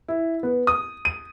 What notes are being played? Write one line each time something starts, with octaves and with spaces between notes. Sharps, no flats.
E4
B3
D#6
D#7